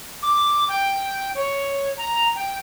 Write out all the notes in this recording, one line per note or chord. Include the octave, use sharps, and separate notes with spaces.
D6
G5
C#5
A#5
G5